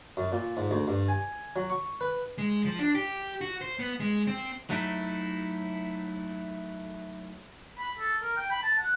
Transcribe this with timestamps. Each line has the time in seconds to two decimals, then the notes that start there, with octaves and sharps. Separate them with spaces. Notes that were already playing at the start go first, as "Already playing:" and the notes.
0.17 F#2
0.32 A#2
0.57 G#2
0.71 D2
0.88 G2
1.08 G#5
1.56 F#3
1.70 C#6
2.01 B4
2.38 G#3
2.65 F3
2.79 D4
2.95 G4
3.41 F#4
3.61 C5
3.79 B3
4.00 G#3
4.27 C4
4.70 F#3 A3 D#4 E4
7.78 B5
7.99 A4
8.22 A#4
8.37 G5
8.51 B5
8.63 A5
8.79 F#5